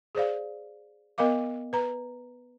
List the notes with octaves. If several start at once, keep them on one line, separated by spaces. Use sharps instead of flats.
G#4 C5 D5 F5
B3 A#4 D#5 F5 D6
B4 A#5